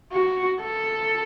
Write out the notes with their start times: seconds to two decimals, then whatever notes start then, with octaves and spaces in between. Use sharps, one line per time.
0.12 F#4
0.61 A4